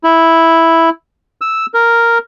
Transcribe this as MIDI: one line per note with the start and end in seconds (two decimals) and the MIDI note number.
0.04 0.89 64
1.41 1.66 88
1.74 2.18 70